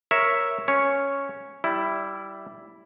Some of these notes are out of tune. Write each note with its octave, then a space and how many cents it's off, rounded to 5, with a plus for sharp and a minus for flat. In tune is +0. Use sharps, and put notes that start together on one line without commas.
A#4 +10 C#5 +0 E5 +0
C#4 +0 C#5 +0
G3 -10 E4 +0